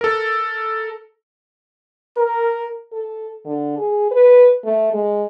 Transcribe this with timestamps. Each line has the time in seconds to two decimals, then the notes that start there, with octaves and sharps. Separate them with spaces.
0.01 A4 A#4
2.16 A#4
2.92 A4
3.45 D3
3.78 G#4
4.11 B4
4.64 A3
4.93 G#3